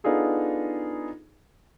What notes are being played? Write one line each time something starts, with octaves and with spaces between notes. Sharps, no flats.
B3 D4 D#4 F4 G#4 A4